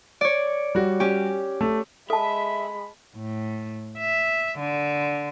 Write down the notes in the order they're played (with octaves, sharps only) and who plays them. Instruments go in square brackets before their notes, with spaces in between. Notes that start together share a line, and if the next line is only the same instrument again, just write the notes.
[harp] C#5 D5
[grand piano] G3 F#4
[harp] C#4 G4
[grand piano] A3
[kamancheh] G#3 B5 [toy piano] A4 A5 [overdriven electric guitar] E5
[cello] A2
E5
D3